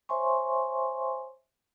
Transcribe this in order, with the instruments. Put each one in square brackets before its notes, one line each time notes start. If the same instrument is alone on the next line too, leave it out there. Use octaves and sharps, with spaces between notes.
[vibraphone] C5 C#5 E5 G#5 C6 C#6